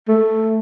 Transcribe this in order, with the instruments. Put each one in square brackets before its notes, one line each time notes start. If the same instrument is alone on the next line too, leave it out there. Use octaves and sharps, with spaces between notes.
[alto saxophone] A3